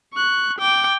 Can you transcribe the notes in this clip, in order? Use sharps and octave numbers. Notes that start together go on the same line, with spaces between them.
C#6 F#6
G5 D6